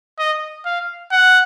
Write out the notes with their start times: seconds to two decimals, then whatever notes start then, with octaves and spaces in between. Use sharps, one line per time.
0.18 D#5
0.65 F5
1.12 F#5